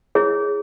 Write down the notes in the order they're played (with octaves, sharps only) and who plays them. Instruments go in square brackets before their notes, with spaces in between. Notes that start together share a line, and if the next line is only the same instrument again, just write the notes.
[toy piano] E4 G#4 C#5